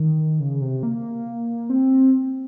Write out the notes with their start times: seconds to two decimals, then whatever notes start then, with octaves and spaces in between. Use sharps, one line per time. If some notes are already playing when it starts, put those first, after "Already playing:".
Already playing: D#3
0.40 C#3
0.61 C3
0.83 A#3
1.70 C4